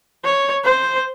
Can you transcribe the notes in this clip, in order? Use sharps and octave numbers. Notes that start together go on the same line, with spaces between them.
C#5
C5